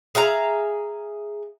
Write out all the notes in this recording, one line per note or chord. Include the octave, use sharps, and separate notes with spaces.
G#4 E5 F5 A#5